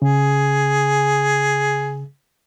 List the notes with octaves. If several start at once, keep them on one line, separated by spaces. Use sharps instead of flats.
C#3 G#4